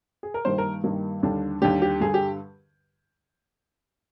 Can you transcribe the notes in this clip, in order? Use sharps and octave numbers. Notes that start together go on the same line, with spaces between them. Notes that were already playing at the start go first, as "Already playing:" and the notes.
G#4
A#4
G2 D#3 G3 A#3 C5
A#4
G2 D#3 G3 A#3
D#2 D3 G3 D4
D#2 D3 G3 D4 G4
G4
G2 D3 G3 G#4
G4